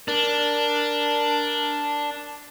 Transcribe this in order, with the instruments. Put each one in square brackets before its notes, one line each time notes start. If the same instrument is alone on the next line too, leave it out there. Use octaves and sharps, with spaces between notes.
[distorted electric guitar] D4 [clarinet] A#4